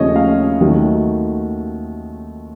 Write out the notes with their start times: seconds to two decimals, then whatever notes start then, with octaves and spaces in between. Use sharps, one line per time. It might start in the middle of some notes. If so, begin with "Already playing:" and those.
Already playing: D#2 C#3 F3 A3 C#5 D#5
0.16 F5
0.60 D#2 D#3 F#3 A3